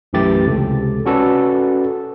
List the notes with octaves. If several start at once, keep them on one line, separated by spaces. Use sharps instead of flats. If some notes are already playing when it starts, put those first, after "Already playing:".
B1 F#2 E3 A3 G4 A6
C#2 C3 A4
C#4 F#4 A4 B4 D5